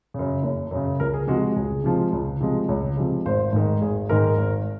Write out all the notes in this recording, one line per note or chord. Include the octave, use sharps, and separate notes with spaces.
F#2 C#3
F#1
F#2 C#3
C#2 A#4
G#4
C3 F3 G#3 F#4
F#4
C#2 G#4
C3 F3 G#3
C#2
C3 F3 G#3
C#2 C#5
C3 F3 G#3
G#1 C5
G#2 D#3 G#3
G#1 G#4
G#2 D#3 G#3 A#4
G#1